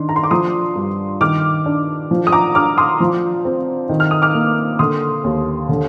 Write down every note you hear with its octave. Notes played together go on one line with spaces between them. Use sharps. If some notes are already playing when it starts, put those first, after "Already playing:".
Already playing: D#3 D4 C6
A#5
C6
D6
F3 C6 D#6
G2
D#3 D6 F6
D4
F3
D#6
A#5 D6
D4 D6 F6
C6 D#6
F3
C4
D#3
F6
D#6
D6 F6
A#3
D3 C6 D#6
D#2
D3